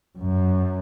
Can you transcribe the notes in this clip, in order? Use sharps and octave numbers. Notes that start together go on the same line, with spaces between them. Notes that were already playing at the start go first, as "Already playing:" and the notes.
F#2